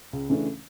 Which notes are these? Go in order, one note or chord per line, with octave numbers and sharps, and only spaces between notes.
C#2
C#3 E3 A3 D4